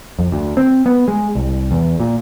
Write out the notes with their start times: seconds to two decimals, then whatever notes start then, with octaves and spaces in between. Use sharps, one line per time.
0.19 F2
0.32 D2
0.57 C4
0.86 B3
1.08 G#3
1.35 C2
1.71 E2
2.00 A#2